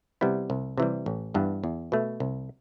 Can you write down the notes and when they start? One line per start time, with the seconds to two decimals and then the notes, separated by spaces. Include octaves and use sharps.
0.21 C3 G3 B3 E4
0.50 C2
0.78 C3 E3 G3
1.06 A1
1.34 G2 E3 B3 D4
1.64 E2
1.92 B2 A3
2.20 C2